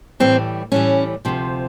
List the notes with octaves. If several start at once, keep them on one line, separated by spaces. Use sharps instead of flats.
A2 E3 G3 C4
A2 E3 G3 C#4
D2 C3 F3